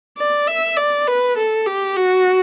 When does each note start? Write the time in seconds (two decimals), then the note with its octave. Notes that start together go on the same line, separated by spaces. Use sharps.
0.18 D5
0.48 E5
0.77 D5
1.08 B4
1.37 A4
1.67 G4
1.96 F#4